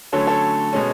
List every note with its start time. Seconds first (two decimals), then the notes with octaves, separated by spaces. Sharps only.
0.12 D3 F#3 A3 C#4 A4 C#5
0.27 A4 C#5
0.73 B2 G#3 C#4